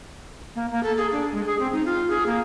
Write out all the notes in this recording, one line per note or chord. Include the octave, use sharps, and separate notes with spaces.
A#3
A#3
A4
G#4
D4
G#3
G#4
C4
D#4
F4
G#4
A#3